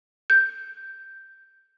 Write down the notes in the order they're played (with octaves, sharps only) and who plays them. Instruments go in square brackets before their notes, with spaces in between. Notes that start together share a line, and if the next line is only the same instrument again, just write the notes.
[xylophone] G6